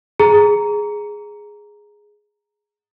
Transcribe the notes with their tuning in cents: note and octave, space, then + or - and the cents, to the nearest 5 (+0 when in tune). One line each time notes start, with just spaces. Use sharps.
G#4 +0 A#5 +0